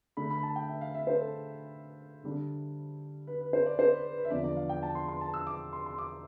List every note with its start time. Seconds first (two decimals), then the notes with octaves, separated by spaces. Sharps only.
0.17 D3 A3 D4 B5
0.30 B5
0.43 A5
0.56 G5
0.69 E5
0.81 F5
0.94 E5
1.07 C5
1.21 A4
2.24 D3 G3 D4
3.27 B4
3.41 B4
3.53 C5
3.66 D5
3.79 C5
3.92 B4
4.05 B4
4.18 B4
4.25 E5
4.30 E2 D3 F3 B3 D4 D5
4.44 D5
4.57 F5
4.69 G5
4.83 A5
4.95 C6
5.08 C6
5.21 A5
5.34 E6
5.47 D6
5.73 C6
5.86 C6
5.98 D6